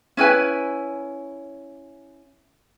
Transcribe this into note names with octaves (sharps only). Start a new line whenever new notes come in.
C#4 E4 B4 G#5